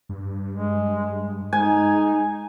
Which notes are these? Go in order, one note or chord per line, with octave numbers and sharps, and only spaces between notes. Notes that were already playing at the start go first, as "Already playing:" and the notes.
G2
G#3
G#3 D#4 G#5